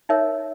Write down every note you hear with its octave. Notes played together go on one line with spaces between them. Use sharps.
D#4 A#4 C#5 E5